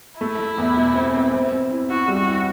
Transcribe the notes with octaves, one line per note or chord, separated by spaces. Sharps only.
A3 E4
A3
E2
B2
C4
C4
C4
C4
E4
E4 F#4
G3
F#4
E4